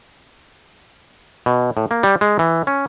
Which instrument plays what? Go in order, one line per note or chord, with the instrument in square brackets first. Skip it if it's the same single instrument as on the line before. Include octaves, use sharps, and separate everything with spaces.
[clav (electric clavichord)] B2
A2
A#3
G3
G#3
E3
C#4